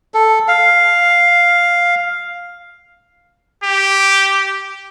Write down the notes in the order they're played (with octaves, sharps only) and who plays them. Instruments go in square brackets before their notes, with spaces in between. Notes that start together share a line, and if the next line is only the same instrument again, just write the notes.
[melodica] A4
F5
[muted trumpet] G4